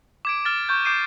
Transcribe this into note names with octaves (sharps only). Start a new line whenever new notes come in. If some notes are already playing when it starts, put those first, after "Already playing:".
D6 G#6 D7
F6 A6
C#6 G6
D6 G6 C7 D7 D#7